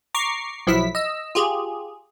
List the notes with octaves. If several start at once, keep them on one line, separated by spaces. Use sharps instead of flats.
A#5 C#6 D6 C7
B1 F3 F#3 E4 B6
D#5 E6
F4 G4 G#4